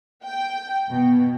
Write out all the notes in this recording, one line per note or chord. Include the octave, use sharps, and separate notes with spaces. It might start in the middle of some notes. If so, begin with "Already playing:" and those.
G5
B2